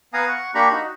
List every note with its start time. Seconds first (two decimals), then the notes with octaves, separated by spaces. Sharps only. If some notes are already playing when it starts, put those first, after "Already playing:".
0.14 B3 F5 F#5 G#5 A#5 D#6
0.28 F#5 C#6
0.55 A#3 D4 G4 A#5 B5 C#6
0.71 D#4 F#4